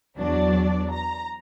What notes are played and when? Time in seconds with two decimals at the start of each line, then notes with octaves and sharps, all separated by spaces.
0.16 E2 F#3 D4 D5
0.92 A#5